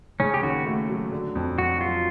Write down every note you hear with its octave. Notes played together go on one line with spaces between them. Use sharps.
C#3 C#4
G4
D#2 F#4
A3
F#3
D3
F2
F2 F#4
F#3 F4